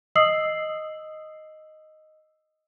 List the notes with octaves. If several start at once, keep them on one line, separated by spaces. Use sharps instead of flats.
D#5 D#6 E6 C7 F#7